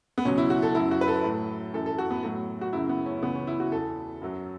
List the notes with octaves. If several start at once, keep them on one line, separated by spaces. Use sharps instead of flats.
B3
C#2 B2 F#3 C#4
E4
F#4
A4
F#2 F#3 E4
F#4
B4
A4
A2 F#3
F#2 E3 A4
A4
F#4
B3
A2 F#3
F#4
F#2 C#3 F#3 E4
B3
C#4
C#2 C#3 E3 B3
C#4
E4
F#4
E2 E3 A4
F#2 F#3